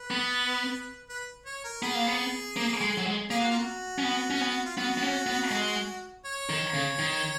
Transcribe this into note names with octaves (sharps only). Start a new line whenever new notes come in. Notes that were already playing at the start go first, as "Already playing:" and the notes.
Already playing: B4
B3
B4
C#5
A#4
B3 G#4
A#3
B3
A#3
G#3
F#3
G#3
A#3 G#4
F#4
F4
F#4
C#4
B3
C#4
B3
F4
B3 F#4
B3
C#4
B3
G#3
C#5
D#3
C#3
D#3